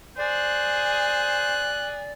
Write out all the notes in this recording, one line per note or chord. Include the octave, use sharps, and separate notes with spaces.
G#4 C5 D5 F#6